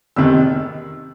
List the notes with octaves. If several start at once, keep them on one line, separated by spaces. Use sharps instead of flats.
F1 E2 C3 D#3 E6